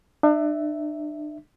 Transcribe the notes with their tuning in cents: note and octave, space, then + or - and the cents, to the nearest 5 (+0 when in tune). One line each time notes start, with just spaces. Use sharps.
D4 +40 E5 +0